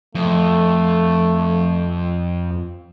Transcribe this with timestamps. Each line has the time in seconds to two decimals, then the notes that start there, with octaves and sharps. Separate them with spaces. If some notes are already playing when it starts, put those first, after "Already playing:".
0.15 F2 A3